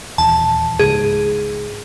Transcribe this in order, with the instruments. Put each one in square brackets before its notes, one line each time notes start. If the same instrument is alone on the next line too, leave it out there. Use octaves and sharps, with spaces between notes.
[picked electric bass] D#1 E2 [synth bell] A5
[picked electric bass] C#2 G#2 [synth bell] G#4